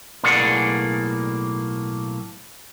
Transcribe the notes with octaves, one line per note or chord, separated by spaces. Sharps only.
B1 A2 A#3 G#4 D5 F#5